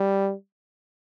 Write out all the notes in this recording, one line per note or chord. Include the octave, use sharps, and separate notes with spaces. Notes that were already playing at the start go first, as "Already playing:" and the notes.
Already playing: G3